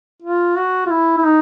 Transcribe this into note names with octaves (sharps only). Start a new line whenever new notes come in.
F4
F#4
F4
E4
E4
D#4